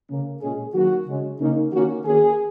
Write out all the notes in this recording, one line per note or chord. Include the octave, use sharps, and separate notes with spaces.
C#3 A#3 C#4
A#2 G#3 C#4 G#4
D#3 F#3 A#3 C#4 F#4
C#3 G#3 C#4
C#3 A#3 C#4 D#4
D#3 A#3 C#4 F#4
D#3 A#3 C#4 G#4